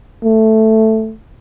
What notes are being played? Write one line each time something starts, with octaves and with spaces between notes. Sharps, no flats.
A3